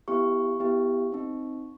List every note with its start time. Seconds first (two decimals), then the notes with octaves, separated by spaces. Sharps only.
0.08 B3 E4 G4 C#6
0.60 B3 E4 G4
1.12 C4 D#4